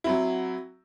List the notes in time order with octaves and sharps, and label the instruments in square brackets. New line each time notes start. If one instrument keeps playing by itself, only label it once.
[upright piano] F#3 C4 E4